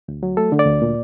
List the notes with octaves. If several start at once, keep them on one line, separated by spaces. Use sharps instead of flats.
D2
F#3
A3 A4
D3
D5
D2
A#2